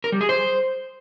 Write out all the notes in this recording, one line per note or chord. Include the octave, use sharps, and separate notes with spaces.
A#4
G3
G#4
C5